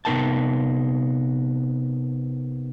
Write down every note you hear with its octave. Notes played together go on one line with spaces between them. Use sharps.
C3 B3 D#4 A#4 G5 A5